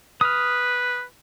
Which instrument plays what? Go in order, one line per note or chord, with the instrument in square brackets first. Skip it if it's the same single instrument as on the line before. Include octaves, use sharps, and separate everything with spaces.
[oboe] B4 [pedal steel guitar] D#6 F6